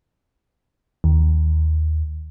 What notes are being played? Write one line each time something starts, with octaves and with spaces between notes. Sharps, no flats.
D#2